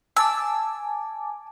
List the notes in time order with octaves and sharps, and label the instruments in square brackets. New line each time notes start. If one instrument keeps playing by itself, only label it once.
[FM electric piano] G#5 A5 D6 [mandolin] E6